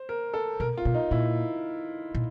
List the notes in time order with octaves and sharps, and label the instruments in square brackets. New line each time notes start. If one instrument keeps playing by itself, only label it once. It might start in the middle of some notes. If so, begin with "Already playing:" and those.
Already playing: [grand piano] C5
A#4
A4
[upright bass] B2 [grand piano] A#4
[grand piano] F4
[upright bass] B2
[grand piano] D#4
[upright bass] A#2 [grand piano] E4
[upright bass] A#2